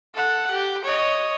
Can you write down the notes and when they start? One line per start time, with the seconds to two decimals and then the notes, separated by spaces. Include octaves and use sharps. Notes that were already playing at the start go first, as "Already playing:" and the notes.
0.14 A4 F#5
0.51 G4
0.84 C#5 D#5